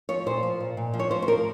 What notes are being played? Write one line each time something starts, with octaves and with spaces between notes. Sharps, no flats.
F3 C#5
A#2 C5
F3
A#2
A#2
F3
C#5
F3 C5
C5
F3 A#4